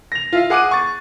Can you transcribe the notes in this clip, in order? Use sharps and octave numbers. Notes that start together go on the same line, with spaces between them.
A#6 F7
F4 E5 F5
G#4 F#5 D6 F#6 D#7
C#6 A6